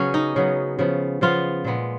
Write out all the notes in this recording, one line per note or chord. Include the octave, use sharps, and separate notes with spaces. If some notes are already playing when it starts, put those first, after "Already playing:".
Already playing: C#3 F#3 B3 C#4
D#4
C#3 F#3 B3
C#3 F3 B3
C#3 F3 B3 F4
A#2 G#3 B3